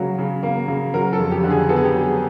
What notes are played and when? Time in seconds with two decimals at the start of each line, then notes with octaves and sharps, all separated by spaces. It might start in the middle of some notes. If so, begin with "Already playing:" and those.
Already playing: C#3 F#3 A#3
0.18 C#3
0.43 A#3
0.68 C#3
0.94 F#3 A#4
1.13 A4
1.19 F2
1.32 G4
1.44 D3
1.51 G#4
1.69 B3 A4
1.76 G#4
1.85 G4
1.92 F#3 G#4